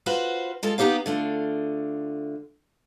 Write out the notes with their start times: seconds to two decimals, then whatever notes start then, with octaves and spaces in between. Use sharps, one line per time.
0.06 F4 F#4 B4 C5
0.63 G#3 F4 A4
0.78 B3 D#4 G4 C5 F5
1.06 D3 A3 F4